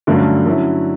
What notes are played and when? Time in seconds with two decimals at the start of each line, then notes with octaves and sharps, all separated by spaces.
0.07 G2 D3 F#3 A3 C#4
0.46 D3 F#3 C#4 E4